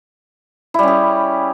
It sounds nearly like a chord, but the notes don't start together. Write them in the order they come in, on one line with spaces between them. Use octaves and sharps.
E4 G3 C#4 G#4